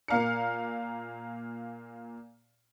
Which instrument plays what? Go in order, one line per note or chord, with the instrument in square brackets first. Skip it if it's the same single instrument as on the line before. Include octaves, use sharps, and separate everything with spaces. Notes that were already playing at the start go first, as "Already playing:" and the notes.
[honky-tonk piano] A#2 A#3 F5 A#5 C#7